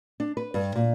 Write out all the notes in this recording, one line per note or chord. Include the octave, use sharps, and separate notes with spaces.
D4
B4
G2
A#2